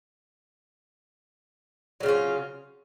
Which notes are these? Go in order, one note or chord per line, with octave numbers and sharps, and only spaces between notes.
C#3 F#3 C#4 F4